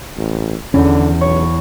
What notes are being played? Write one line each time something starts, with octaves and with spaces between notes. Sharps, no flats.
A1
E2 D3 C#4
B1 C#5